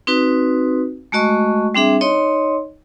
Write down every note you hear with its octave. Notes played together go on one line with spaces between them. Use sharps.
C4 D#4 F#4 B4
G#3 A3 F#4 D#5 C#6
G3 C4 D4 G#4 E5
D#4 C#5 D#5 C6